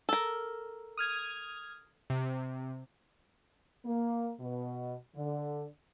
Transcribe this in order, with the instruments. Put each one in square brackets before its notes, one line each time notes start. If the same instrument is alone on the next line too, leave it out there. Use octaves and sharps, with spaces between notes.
[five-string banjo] A4 A#4
[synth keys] D#6 F6 G#6
C3
[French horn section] A#3
B2
D3